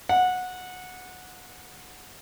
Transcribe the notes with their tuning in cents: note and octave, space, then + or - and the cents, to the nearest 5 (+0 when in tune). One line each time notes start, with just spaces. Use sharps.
F#5 -15